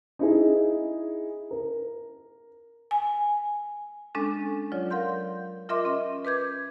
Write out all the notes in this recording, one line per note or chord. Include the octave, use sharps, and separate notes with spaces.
D#4 E4 G#4
A#4
G#5
G#3 C#4 D4 A4
F#3 F4 C#5 D5
A#4 F5 F#5 C6 G6
F4 A#4 D#5 E5 C6 D6
C#4
B4 D6 G6 G#6